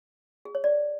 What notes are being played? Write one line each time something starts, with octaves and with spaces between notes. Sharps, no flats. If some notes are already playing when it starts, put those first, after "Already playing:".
G#4
C#5
D5